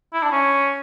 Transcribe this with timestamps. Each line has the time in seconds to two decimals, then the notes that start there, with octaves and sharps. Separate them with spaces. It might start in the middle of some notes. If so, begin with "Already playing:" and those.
0.13 E4
0.22 D4
0.32 C#4